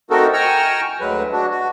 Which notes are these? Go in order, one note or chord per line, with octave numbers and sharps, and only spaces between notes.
A3 C4 D#4 F#4 A4 A#4
G5 G#5 A#5 C#6 E6 F6
D2 F#3 G#3 B4
D4 F#4
F#4